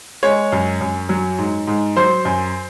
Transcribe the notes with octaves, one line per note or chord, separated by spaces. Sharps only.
G#3 C#5
F#2
F#2
F#3
G#2
G#2
F#3 C5
F#2